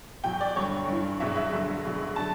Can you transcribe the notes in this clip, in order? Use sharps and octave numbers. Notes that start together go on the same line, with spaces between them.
E2 B2 F#3 G5
D5
G2 D3 F#3 C#5
G2 E3
C#2 B2 F#3 E5
E5
G2 D3 F#3
C#2 B2 F#3
D3 F#3 A5